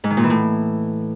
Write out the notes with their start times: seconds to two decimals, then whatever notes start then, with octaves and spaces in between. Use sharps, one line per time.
0.04 G#2
0.10 D#3
0.17 A#2
0.23 E3
0.30 A2